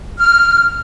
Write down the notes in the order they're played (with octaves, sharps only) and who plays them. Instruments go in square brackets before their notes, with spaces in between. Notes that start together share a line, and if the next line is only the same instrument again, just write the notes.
[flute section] F6